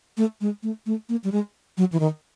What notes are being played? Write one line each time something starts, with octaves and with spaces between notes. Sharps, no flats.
A3
G#3
A3
A3
A#3
G3
G#3
F#3
E3
D#3